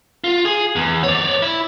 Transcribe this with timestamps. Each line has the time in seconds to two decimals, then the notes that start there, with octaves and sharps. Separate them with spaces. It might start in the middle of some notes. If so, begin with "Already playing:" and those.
0.24 F4
0.45 G#4
0.76 E2
1.03 C#5 D5
1.42 E4